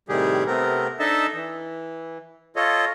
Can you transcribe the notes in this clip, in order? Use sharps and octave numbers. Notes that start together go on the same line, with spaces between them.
A2 C3 D#3 G3 G4 G#4
C3 A3 B3 C4 A#4
D4 D#4 A4 D#5 E5 A5
E3
F4 A4 C#5 D#5